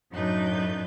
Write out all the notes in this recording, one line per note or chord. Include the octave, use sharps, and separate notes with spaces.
F#2 A2 D4 D#4 B4 G6